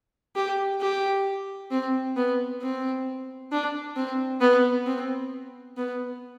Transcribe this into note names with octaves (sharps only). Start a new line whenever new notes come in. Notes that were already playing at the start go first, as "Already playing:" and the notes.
G4
G4
C4
B3
C4
D4
C4
B3
C4
B3